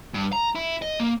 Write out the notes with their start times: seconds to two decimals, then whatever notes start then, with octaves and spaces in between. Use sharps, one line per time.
0.14 G2
0.33 A#5
0.55 E4
0.82 D#5
1.00 A#3